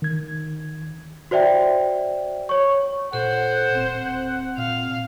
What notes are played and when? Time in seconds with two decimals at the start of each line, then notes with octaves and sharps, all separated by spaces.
0.02 D#3 G#6
1.31 F#4 C5 D5 E5 G5
2.49 C#5 C#6
3.13 A#2 A4 C5 F#5
3.75 D1 C4
4.57 A#2 F5